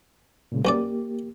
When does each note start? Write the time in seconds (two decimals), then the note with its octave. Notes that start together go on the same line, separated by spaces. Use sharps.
0.52 A#2 C#3 G#3
0.65 B1 A#3 C#4 G4 D5